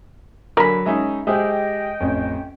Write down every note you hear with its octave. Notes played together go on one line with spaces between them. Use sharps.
D3 F#3 A#4 G#5 B5
G#3 C#4 D#4 E5 A#5
G#3 G4 G#4 C5 D#5 E5 G5 D#6
A1 F2 C#4